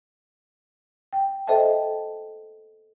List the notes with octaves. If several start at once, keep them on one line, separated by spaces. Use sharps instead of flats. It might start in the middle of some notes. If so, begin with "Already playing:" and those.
G5
A4 C5 D#5 E5 G5 A5